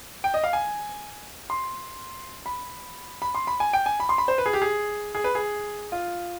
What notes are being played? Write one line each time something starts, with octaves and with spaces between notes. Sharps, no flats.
G5
D#5
F5
G#5
C6
B5
B5
C6
B5
G#5
G5
G#5
B5
C6
B5
C5
B4
G#4
G4
G#4
G#4
B4
G#4
F4